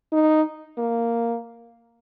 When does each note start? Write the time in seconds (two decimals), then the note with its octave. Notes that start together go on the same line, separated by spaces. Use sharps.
0.12 D#4
0.78 A#3